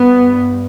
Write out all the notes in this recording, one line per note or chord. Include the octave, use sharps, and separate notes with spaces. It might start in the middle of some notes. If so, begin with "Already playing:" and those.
Already playing: G2 B3